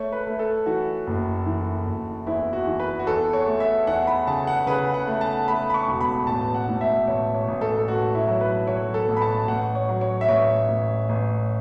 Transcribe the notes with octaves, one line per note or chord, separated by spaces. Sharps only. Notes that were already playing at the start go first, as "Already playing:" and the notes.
Already playing: A3 C#5
B4
A3
A4
E3 F#4
F#1
E3
F#1
E2 E4
F#4
E3
B4
F#4
E2 A4
C#5
A3
E5
E2 F#5
B5
C#3 A5
F#5
C#3 B4
F#5
A3
A5
A3 B5
B5
C#6
E1
B5
A1 A5
F#5
A2
E5
A1 C#5
C#5
A1
A4
A4
A1 F#4
E4
F#3
B4
F#3 C#5
A4
A1
B5
A5
A1 F#5
C#5
F#3
C#5
E5
A1 C#5
A1
A1